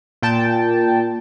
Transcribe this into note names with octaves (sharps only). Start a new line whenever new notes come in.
A#2 G5 A5